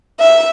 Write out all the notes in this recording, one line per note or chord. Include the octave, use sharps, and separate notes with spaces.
E5